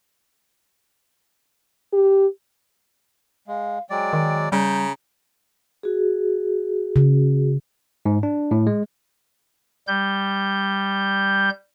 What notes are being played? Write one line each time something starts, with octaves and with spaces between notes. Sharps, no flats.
G4
G#3 F5
F#3 G#3 D5 G5
D#3
C#3 G3 A#5 G6
F#4 G#4
C#3
G#2
D4
A2
G#3
G3 G6